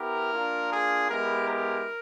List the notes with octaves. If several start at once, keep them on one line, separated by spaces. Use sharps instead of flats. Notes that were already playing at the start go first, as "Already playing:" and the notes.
Already playing: B3 E4 G4 A#4
A#3 D4 F4
G#4
G#3 B3 E4 G4 A#4
A#4